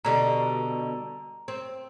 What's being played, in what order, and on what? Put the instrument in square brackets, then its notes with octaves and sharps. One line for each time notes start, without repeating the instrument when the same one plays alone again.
[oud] B2 D3 G3 [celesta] A#5
[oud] C4